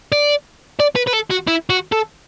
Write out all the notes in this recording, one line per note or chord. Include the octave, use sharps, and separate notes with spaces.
D5
D5
B4
B4
A4
F#4
E4
F#4
A4